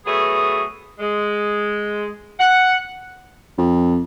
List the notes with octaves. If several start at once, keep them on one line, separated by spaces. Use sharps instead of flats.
F#3 A3 B3 G#4
G#3
F#5
F2